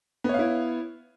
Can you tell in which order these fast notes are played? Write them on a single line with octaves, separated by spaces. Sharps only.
B3 C#5 F5 E4